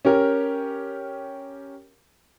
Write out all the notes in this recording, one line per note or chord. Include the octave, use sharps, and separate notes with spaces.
C#4 G4 A#4